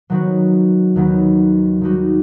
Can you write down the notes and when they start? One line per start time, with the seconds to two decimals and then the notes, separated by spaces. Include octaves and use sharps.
0.10 D#3 F#3 B3 F#4
0.96 D#2 D#3 F#3 B3
1.81 D#3 G3 D#4 F#4